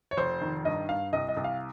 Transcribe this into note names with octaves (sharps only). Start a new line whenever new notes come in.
C#5
F1 C5
D#3
G2 D#5
G2 F5
C2 D#5
D#5
C2
F5